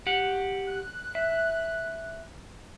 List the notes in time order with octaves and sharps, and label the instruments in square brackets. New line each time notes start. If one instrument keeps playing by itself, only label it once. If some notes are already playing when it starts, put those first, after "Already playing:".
[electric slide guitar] G4 F#5
[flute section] F#6
[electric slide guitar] E5